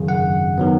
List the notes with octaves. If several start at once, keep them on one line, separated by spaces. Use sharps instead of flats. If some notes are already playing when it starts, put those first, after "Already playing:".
Already playing: G#1 F#2 C#3
F#5
D#3 F#3 B3